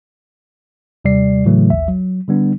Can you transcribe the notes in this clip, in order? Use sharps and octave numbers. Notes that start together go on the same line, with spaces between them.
D#2 C3 G3 D5 C7
A2 C#3 E3 F#3 A3
A1 D#2 E5
F#3
D3 G3 B3 D4